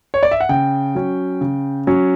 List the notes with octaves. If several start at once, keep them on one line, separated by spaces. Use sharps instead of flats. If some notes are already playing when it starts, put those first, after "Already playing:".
C#5
D5
E5
F#5
C#3 G5
F#3 C#4
C#3
F#3 C#4